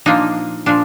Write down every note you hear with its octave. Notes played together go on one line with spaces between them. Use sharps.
A#2 F3 A#3 D4 D#4
A#2 F3 D4